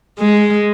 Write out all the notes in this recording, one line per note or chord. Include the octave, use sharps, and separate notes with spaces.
G#3